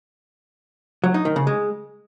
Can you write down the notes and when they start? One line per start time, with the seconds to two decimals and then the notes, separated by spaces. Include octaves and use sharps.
1.04 F#3
1.14 D#4
1.25 D#3
1.36 C#3
1.47 G#3